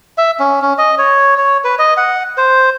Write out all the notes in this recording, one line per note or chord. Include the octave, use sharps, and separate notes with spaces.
E5
C#4
C#4
D#5
C#5
C#5
B4
D#5
F#5
C5